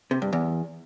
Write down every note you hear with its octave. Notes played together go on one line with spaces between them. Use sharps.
C3
G2
E2